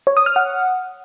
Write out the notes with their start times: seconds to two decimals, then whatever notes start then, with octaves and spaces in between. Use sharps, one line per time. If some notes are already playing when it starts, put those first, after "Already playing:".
0.07 C#5
0.17 D#6
0.26 F6
0.36 F#5